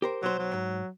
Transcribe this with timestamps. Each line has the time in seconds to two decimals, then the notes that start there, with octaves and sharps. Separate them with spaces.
0.02 G4 A#4 C5
0.23 B1 F#3 C5
0.39 F#3
0.54 G#2